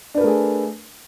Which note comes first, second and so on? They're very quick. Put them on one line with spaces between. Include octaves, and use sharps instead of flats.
D4 B4 A#4 A3 G#4